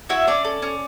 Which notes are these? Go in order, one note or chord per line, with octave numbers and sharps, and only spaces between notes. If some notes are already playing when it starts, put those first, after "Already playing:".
E4 F#4 E5
C#4 D4 D5
A4
C#4